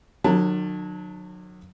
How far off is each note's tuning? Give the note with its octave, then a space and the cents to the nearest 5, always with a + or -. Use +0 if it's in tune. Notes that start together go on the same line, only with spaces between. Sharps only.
D3 +45 F#3 -25 A5 +0